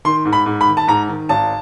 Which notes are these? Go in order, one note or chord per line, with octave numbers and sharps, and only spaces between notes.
D#3 C6
G#2
B5
G#2
B5
D#3
A5
G#2 A#5
D#3
G#1 A5